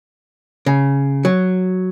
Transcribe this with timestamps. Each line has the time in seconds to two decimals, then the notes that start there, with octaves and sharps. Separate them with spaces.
0.66 C#3
1.25 F#3